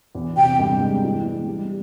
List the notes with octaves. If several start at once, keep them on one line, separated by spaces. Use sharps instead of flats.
E2
C3 G5
G2
G#3
E3
G#3
G3